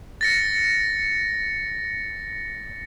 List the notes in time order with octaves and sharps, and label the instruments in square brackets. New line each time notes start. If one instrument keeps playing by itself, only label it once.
[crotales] A6 A#6 C#7